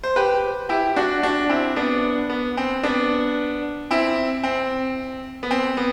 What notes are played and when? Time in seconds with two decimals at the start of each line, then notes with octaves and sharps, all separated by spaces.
0.03 C5
0.16 G4 B4
0.69 E4 G4
0.96 D4 F#4
1.23 D4 F#4
1.49 C4 E4
1.76 B3 D4
2.30 B3
2.57 C4
2.83 B3 D4
3.91 C4 E4
4.44 C4
5.43 B3
5.51 C4
5.77 B3